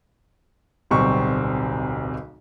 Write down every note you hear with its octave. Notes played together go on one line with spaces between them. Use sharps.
D1 B1 G3 C4 C#6